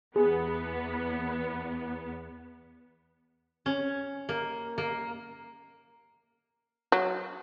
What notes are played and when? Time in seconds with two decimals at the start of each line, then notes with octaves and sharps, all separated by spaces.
0.16 E2 B3 G#4
3.66 C#4
4.29 A#3
4.78 A#3
6.92 F#3